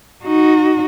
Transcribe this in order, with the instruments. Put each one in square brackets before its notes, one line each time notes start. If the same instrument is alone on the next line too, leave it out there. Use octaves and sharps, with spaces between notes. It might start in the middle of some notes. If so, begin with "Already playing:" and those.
[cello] D#4 F#4